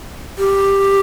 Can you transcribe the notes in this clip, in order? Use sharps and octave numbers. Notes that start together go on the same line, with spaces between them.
G4